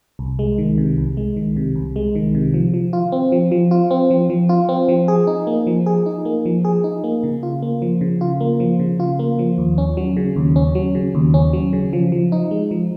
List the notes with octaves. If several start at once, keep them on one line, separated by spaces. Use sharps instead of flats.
C2
G#3
D#3
C3
C2
G#3
D#3
C3
C2
G#3
D#3
C3
F3
F3
F4
C4
F3
F3
F4
C4
F3
F3
F4
C4
F3
G#4
D#4
A#3
F3
G#4
D#4
A#3
F3
G#4
D#4
A#3
C#3
F4
A#3
F3
C#3
F4
A#3
F3
C#3
F4
A#3
F3
D#2
C#4
F#3
C#3
D#2
C#4
F#3
C#3
D#2
C#4
F#3
C#3
F3
F3
D#4
G#3
F3